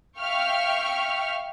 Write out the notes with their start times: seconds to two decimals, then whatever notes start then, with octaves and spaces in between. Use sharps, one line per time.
0.19 E5 F5 G5 C#6 F6